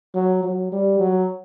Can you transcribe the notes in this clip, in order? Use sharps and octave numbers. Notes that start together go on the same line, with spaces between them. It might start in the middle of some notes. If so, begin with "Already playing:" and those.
F#3
F#3
G3
F#3